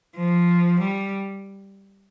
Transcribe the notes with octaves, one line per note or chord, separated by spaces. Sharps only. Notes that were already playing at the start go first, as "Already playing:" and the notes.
F3
G3